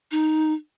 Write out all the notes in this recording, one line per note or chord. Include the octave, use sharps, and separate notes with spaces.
D#4